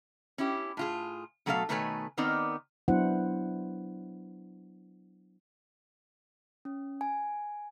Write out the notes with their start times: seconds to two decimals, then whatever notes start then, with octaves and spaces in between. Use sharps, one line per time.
0.38 C#4 E4 G4
0.77 A2 F4 G#4
1.46 B2 F#3 A3 A4 B4 F5
1.69 B2 D#3 A3 B4 C#5 G#5
2.17 D#3 B3 C4 D#4 A#4 D5
2.88 F#3 B3 D4 E4 C5 F#5
6.65 C#4
7.01 G#5